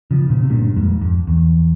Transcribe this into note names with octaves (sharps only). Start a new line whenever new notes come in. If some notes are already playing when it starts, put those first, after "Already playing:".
C#3 F3
A#2 C#3
C3
G2 A#2
F2 G#2
F2
E2